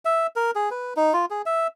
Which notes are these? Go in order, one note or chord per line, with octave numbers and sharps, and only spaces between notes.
E5
A#4
G#4
B4
D#4
F4
G#4
E5